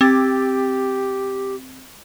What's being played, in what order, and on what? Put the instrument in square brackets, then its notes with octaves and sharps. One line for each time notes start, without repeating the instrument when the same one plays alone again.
[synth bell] C4 D6 A6 [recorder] G4